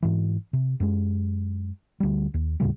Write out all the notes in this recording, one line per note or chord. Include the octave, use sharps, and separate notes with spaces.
G#2 E3
C3
F#2 G#3
D2 G3
D#2
D#2 A2 C#3 G3